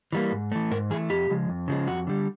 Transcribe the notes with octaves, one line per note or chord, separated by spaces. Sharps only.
E3 G3 A#3
G#2
E3 A3
G#2 A#4
E3 A3 G#4
F2 G4
C#3 F3 G#3
F2
C#3 F3 G#3
F2 F#4
D3 G3